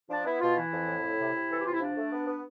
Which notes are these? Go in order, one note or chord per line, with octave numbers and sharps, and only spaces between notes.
F3 D4
B3 E4
B2 F4
E3 E4
F2
A2
A2
C3
C3
E3 A4
G4
C3 F4
E4
F3 D4
A3
B3
B3